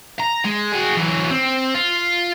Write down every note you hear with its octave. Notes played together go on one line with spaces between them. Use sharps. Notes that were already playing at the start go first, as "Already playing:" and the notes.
A#5
G#3
F#4 G#4
E3 F#3
C4
F4